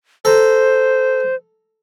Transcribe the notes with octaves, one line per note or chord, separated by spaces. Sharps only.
A4 C5 A#5